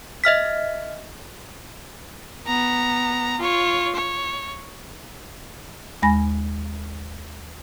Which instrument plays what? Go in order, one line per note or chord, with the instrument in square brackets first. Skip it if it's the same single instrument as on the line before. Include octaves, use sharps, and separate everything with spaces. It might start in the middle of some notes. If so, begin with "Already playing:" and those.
[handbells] D#5 E5 F6 B6
[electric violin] B3 A#5
F4 C#5
C#5
[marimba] D#2 G#3 G#5 B5 A#6